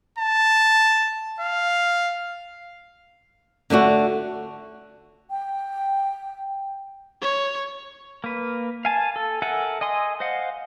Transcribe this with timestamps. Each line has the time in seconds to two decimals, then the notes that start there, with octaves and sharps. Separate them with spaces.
0.19 A5
1.41 F5
3.70 D3 A3 D4 F#4
5.30 G5
7.21 C#5
8.24 A#3 B4
8.85 F5 G#5 A5
9.16 A4
9.42 A4 A#4 E5 F#5 G#5
9.81 D#5 G#5 C6 D#6
10.20 C5 D#5 F5 F#5